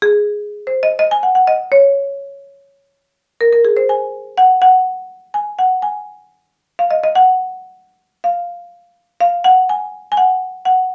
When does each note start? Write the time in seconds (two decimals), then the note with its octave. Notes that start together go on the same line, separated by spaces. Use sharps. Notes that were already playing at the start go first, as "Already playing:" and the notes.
0.02 G#4
0.67 C5
0.83 D#5
0.99 D#5
1.11 G#5
1.23 F#5
1.35 F#5
1.47 D#5
1.72 C#5
3.41 A#4
3.53 A#4
3.65 G#4
3.77 C5
3.89 G#5
4.38 F#5
4.62 F#5
5.34 G#5
5.59 F#5
5.82 G#5
6.79 F5
6.91 D#5
7.03 D#5
7.15 F#5
8.24 F5
9.21 F5
9.44 F#5
9.69 G#5
10.12 G#5
10.17 F#5
10.65 F#5